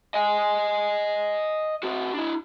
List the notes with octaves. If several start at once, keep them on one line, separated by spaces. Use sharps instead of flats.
D#5 G#5
C4 F#4
D4 E4